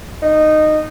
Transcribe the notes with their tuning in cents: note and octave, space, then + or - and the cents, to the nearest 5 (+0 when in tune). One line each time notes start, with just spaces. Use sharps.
D#4 -15